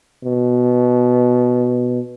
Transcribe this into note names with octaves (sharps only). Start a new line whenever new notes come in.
B2